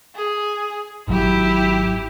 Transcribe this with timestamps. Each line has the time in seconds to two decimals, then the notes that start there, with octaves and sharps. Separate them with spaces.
0.15 G#4
1.08 G#1 F#3 E4 G4